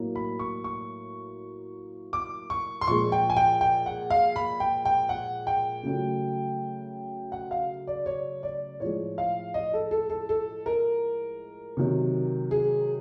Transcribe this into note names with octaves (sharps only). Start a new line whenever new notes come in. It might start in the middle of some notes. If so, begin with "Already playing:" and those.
Already playing: A2 F#3 A#3
B5
C#6
C#6
D6
C#6
C6
A#2 F3 G#3 C#6
G5
G#5
G5
G5
F#5
F5
B5
G5
G5
F#5
G5
C#3 F#3 A3
F#5
F5
D5
C#5
D5
A2 F3 G#3 C#5
F5
D#5
A4
A4
A4
A4
A#4
C3 D#3 F#3
G#4